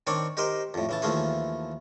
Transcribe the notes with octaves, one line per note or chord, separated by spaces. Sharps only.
D#3 C4 D4 C#5 D5
D#4 G4 A#4 C5 D#5
F2 A2
C#3 E3 A5
D#2 E3 F3 A3 G#4